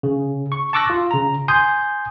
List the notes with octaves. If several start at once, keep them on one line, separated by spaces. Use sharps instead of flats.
C#3
C#6
A5 C#6 D6 E6 F#6 A#6
F4
C#3 A#5
G#5 C6 D#6 G6